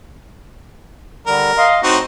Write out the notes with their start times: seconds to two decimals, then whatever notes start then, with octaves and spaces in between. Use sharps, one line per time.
1.27 D3 G3 A#4
1.58 D#5 F5 C6
1.83 A2 C4 D#4 F#4